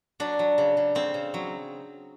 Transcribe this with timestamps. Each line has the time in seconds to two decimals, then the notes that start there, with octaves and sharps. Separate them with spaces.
0.20 F#3 D4
0.39 F#3
0.58 C#3
0.77 C#3
0.95 C#3 C4
1.14 C#3
1.34 F#3